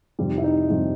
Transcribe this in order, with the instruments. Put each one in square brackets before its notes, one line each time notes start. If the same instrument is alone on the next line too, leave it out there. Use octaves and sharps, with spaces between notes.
[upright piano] F2 C3 D#3 G3
E4
D#4
F2 C3 D#3 G3